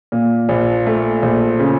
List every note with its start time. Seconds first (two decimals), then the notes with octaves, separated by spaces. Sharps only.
0.12 A#2
0.49 A#1
0.87 A3
1.22 A#1
1.60 C#3